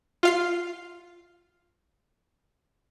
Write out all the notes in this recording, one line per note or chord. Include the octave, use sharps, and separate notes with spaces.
F4 F5 C7